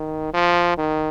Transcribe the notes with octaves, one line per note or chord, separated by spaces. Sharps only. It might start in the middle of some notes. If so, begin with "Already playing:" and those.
Already playing: D#3
F3
D#3